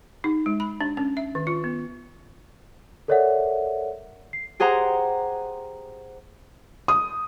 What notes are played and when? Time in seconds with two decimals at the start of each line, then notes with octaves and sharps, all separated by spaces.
0.24 D#4
0.46 G#3
0.60 B5
0.81 D4
0.97 C#4
1.17 E5
1.35 D#3
1.47 F4
1.64 B3
3.08 A4 A#4 C#5 D5 E5 F#5
4.33 C7
4.60 G4 G#4 C5 F#5 A#5
6.88 D#6